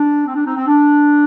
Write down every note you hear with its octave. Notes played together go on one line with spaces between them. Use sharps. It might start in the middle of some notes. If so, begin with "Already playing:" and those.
Already playing: D4
C4
D4
C4 D#4
C4
D4